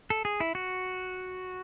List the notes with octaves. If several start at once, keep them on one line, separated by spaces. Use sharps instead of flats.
A4
G#4
E4
F#4